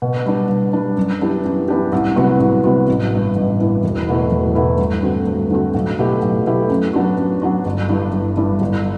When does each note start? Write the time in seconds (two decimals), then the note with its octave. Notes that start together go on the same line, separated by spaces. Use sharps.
0.02 B2
0.26 G3 D4
0.49 B2
0.73 G3 D4
0.96 F#2
1.21 E3 B3 D4 G4
1.45 F#2
1.68 E3 B3 D4 G4
1.92 C2
2.16 C3 F#3 B3 F#4
2.40 C2
2.64 C3 F#3 B3 F#4
2.88 A1
3.11 G2 E3 B3
3.36 A1
3.60 G2 E3 B3
3.84 E1
4.07 E2 B2 A3 E4
4.31 E1
4.55 E2 B2 A3 E4
4.78 G2
5.03 D3 A3 C4 F#4
5.27 G2
5.51 D3 A3 C4 F#4
5.75 B1
5.99 B2 A3 E4 G4
6.22 B1
6.46 B2 A3 E4 G4
6.70 F#2
6.93 F#3 B3 D4 F#4
7.17 F#2
7.42 F#3 B3 D4 F#4
7.66 G1
7.89 G2 E3 G3 D4
8.13 G1
8.37 G2 E3 G3 D4
8.61 G1